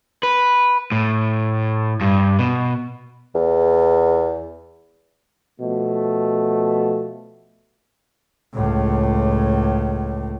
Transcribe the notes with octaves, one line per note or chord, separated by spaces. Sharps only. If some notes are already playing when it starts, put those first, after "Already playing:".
B4
A2
G2
B2
E2
B2 F3 A3
C#2 A2